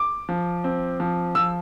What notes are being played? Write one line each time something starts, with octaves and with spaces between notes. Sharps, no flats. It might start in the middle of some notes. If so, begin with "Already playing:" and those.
Already playing: D6
F3
C4
F3
F3 E6